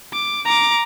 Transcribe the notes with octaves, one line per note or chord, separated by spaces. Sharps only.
D6
A#5 D6